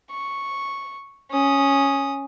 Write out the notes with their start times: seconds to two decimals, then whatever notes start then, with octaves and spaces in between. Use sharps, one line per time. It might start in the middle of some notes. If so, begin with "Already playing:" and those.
0.11 C#6
1.31 C#4 D#6